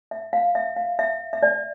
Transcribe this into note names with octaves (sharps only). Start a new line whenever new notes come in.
E5
F5
E5
F5
E5
E5
D5